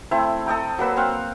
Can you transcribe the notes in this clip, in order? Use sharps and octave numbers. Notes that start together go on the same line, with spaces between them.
A3 C4 E4
A4 D#5 G5 A#5
F#3 A#3 B4 E6
C4 F5 F#5